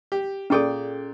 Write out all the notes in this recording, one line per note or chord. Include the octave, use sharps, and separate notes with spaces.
G4
A#2 C#4 G#4 A4 D5 G5